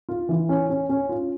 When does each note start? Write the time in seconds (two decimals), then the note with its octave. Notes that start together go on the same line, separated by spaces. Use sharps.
0.09 F4
0.29 E3
0.49 C#4
0.70 C#4
0.89 C#4
1.09 F4